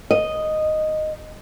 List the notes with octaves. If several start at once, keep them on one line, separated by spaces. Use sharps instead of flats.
D#5